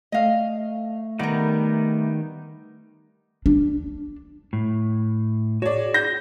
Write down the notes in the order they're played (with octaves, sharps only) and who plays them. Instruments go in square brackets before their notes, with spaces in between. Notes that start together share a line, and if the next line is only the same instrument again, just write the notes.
[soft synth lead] A3 [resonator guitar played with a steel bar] D#5 F5
[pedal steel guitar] D#3 G3 D#4 [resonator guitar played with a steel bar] B3 A#4
[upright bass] D4
[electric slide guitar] A2
[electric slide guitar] F#4 G#4 [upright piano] C#5 D5
[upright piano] G6 A#6